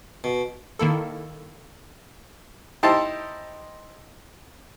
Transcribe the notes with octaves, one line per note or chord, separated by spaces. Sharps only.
B2
D#3 A#3 E4 A4
D#4 E4 G4 C5 A5 C6